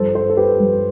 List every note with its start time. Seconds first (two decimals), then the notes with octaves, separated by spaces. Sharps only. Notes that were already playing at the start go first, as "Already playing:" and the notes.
Already playing: G2 F3 A4 C5
0.15 A4 C5
0.30 A4
0.37 G4 B4
0.60 G2 F3